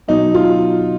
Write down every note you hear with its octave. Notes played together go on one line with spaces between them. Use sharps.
B2 F#3 D#4
F4